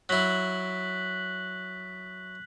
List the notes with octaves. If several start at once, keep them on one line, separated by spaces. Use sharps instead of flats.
F#3 E4 F#6 B6 F#7